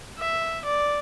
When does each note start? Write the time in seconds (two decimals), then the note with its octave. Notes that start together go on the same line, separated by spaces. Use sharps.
0.18 E5
0.65 D5